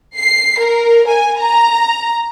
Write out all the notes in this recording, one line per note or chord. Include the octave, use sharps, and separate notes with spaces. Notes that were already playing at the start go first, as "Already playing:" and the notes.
C7
A#4
G#5
A#5